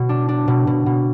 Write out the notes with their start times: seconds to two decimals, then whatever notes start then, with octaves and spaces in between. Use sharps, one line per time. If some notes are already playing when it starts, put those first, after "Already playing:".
Already playing: B2
0.09 D4
0.29 D4
0.48 B2
0.67 B2
0.86 B2